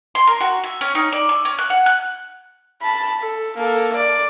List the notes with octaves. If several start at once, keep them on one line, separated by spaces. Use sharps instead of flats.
C6
A#4
F#4
E5
C#4
D#4
D5
E6
C#4
F#6
F#5
F#6
A5 B5
A4
A#3 A4
D5